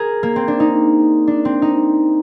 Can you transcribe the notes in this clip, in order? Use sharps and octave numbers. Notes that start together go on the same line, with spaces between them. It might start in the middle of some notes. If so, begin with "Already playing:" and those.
Already playing: G#4 A#4
A#3
C4
D4
D#4
D4
C4
D#4